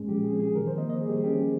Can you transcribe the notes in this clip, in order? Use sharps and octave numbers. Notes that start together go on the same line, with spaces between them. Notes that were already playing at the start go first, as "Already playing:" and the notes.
Already playing: A#2 G#3 C#4 G#4
F3 G4
G#4
C4
G#4
D#3 A#4
C5
A#3 D#5
D#5
G3 G#4
G4
G#4
C#4 G4